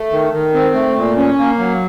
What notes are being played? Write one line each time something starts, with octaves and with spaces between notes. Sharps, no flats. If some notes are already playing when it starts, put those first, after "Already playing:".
Already playing: A3
D#3
D#3
C4
A3
A#2
C#4
A#3
F#3